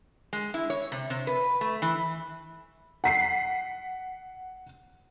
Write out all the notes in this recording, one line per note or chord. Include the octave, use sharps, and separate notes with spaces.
G#3
E4
C#5
C3
C3
B4
A3
E3
F#5 B6 C7